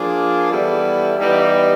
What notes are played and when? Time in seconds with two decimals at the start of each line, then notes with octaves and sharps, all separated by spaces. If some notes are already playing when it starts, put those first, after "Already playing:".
Already playing: F3 A#3 D4 F4 G#4
0.50 E3 G3 B3 E4 A4
1.18 E3 G3 B3 D#4 G4